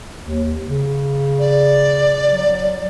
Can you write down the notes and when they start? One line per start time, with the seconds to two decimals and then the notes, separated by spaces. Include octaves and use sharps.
0.23 D#2
0.67 C#3
1.39 D5
2.30 F#3